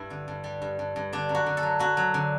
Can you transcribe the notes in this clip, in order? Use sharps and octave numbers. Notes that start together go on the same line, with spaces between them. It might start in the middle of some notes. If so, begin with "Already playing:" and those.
Already playing: G2 E4
D3
G2
G3
G2
G2
G2
D3 D4
F#2
F#4
D3
A4
F#3
F#3 F#4
F#3
D3